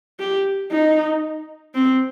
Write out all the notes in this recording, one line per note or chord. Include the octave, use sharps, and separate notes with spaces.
G4
D#4
C4